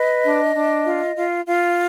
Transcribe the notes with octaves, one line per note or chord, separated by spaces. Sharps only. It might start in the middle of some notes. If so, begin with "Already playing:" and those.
Already playing: B4 D#5
D4
D4
F4
F4
F4